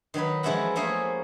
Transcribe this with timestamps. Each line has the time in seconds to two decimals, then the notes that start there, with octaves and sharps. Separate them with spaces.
0.14 D#3 F#3 D#4 B4
0.43 E3 F3 G#3 C#4 E4 F#4
0.76 A3 A#3 C#4 G#4 C5